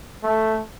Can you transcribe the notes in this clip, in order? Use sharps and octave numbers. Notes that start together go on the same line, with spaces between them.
A3